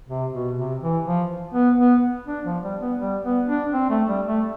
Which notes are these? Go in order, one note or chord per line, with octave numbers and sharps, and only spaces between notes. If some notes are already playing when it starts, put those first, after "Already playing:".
C3
B2
C3
E3
F3
B3
B3
D4
F3
G3
B3
G3
B3
D4
C4
A3
G3
A3